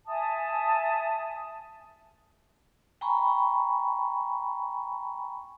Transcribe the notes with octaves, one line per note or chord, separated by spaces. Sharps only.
E5 G#5 A5 D#6
G5 G#5 A#5 B5 C#6